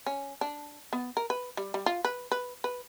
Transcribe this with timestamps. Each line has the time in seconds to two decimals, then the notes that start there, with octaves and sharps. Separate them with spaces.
0.06 C#4
0.41 D4
0.93 B3
1.17 A#4
1.30 B4
1.57 G3
1.74 G3
1.86 F4
2.05 B4
2.31 B4
2.64 B4